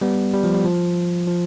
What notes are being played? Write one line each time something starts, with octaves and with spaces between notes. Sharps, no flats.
G3 B3
G3
F3
G3
F3
F3